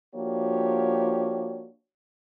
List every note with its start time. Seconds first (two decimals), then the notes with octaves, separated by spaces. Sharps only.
0.14 F3 A#3 D4 F#4 G4 C#5